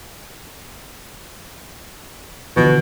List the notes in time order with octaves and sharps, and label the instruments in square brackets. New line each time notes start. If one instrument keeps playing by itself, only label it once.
[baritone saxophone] B2 [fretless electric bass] D3 E3 F3